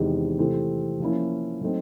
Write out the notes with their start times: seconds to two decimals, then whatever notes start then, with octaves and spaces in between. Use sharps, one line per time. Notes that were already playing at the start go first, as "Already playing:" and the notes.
Already playing: E2 C3 D#3 G#3 C4
0.39 C3 E3 A3 C4
1.00 F3 A#3 C#4 E4
1.61 F#3 A3 C4 D#4